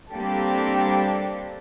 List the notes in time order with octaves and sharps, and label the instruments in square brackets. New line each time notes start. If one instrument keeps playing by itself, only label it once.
[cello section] G3 A#3 C4 D4 G4 A4